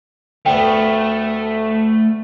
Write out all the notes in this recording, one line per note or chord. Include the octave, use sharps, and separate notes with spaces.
D2 A3 B3 G5